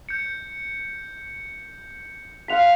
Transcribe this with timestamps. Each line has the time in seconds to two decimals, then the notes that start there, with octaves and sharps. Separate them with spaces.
0.09 G6 C#7
2.48 F5 F#5 C6 B6 F7